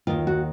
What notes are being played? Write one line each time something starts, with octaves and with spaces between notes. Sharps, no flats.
D#2 D#3 F4
F#4